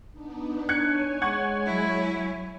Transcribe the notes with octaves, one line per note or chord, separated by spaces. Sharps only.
B3 D4 D#4
D4 C#5 G#5 F#6 G#6 C#7
G#3 F#5 C#6 G#6
F#3 E4